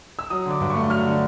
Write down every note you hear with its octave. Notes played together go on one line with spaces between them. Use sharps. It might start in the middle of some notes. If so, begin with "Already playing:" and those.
E6
F#3 D#6
D3 D6
G2
A3 C#6
F#3 F6
D3